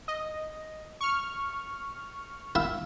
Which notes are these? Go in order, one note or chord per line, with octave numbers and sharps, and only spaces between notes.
D#5
C#6 F6
E4 E5 F5